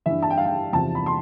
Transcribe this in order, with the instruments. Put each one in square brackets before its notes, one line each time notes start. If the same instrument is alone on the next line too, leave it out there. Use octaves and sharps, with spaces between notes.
[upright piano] G2 E3 E5
A5
G5
F5
G5
E2 C3 F3 A5
B5
C6